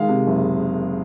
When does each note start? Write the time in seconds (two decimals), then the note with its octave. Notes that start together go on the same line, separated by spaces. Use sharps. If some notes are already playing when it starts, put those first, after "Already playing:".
Already playing: D#3 G#3 F5
0.09 C3
0.27 F#1